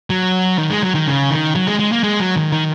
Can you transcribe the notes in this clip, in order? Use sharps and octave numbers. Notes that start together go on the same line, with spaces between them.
F#3
D#3
G#3
F#3
D#3
C#3
D#3
F#3
G#3
G#3
A#3
G#3
F#3
D#3
D#3